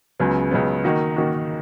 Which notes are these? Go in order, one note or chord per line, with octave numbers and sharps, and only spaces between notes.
C#2 C#3 F#3 B3
C#2 C#3 F#3 B3
D#3 A#3 D#4 F#4
D#3 A#3 D#4 F#4